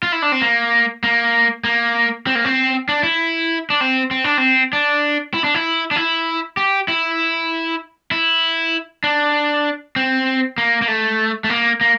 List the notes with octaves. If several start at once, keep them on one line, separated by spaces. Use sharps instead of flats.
F4
E4
D4
C4
A#3
A#3
A#3
C4
A#3
C4
D4
E4
D4
C4
C4
D4
C4
D4
E4
D4
E4
D4
E4
G4
E4
E4
D4
C4
A#3
A#3
A3
A3
A#3
A#3